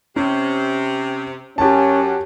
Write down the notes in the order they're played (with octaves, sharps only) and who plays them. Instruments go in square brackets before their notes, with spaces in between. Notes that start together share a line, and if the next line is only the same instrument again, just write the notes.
[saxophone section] C3 [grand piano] C#4
[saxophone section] F#2 [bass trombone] C#4 [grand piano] G4 A5